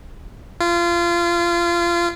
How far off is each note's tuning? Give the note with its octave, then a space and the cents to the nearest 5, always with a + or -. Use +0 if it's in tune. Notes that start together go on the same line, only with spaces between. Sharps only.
F4 -25